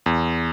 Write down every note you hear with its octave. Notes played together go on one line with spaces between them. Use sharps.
E2